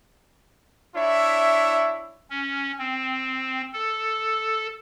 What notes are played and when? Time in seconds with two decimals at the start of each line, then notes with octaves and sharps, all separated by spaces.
0.95 D4 E4 C#5 E5
2.30 C#4
2.79 C4
3.73 A4